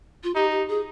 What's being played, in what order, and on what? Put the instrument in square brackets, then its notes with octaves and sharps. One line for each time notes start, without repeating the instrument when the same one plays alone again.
[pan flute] F4
[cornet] D#4 [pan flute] G4
[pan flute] G4
G#4